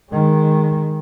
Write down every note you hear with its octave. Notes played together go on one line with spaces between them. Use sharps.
D#3 G#3